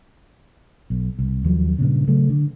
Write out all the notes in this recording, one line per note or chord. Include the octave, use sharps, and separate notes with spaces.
B1
C2
D#2 F3 F#3
G2 A#2 C#3
C#3 F#3 A3
D3